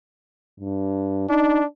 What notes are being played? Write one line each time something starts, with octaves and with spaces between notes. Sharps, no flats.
G2
D4 D#4